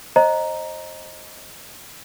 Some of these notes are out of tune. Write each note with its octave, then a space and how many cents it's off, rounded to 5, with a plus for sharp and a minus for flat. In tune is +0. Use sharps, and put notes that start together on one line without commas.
C5 +30 D#5 +0 A#5 +0